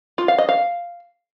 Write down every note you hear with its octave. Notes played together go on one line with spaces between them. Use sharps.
F4
F5
D#5
F5